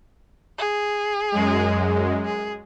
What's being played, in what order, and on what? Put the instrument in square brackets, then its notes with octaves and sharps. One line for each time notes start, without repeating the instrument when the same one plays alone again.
[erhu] G#4
[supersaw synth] F#2 G#3
[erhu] G#4